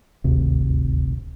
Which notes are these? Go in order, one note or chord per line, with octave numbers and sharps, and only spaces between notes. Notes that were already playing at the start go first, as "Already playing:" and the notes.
D#1 G#1 D2 C3